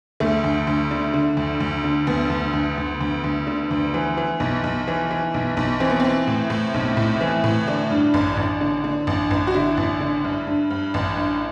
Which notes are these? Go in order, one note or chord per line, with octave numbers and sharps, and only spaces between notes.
D2 A3
D2
D2
D3
D3
D2
D2
D3
D2 B3
D2
D2
D2
D2
D2
D3
D2
E3
E3
B1
B1
E3
E3
B1
B1
E3 C4
B3
E3 C4
A2
A2
B1
A2
E3
A2
D3 D4
G2
A1
A1
D3
D3
A1
A1
F#4
D3 E4
A1
D3
G2
G2
G2
A1
G2